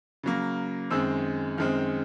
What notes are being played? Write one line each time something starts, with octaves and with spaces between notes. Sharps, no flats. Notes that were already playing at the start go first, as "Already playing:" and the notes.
C#3 F#3 A#3
F#2 D#3 G#3 C4 E6
F#2 D#3 G#3 C4 F6